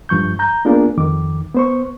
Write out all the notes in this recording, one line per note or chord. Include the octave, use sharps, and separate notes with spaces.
G2 F3 C#6 G6
A#5 G6
A#3 B3 D4 F4 G#4 A#4
F2 D#3 D6
B3 C5 C#6